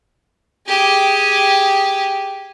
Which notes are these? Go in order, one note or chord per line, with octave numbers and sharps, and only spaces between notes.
G4 G#4